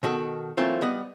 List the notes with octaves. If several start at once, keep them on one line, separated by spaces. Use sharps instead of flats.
B2 D#3 F#4 A4
E3 F#3 A3 A#3 C4 F4
G3 B3 D#5 F#5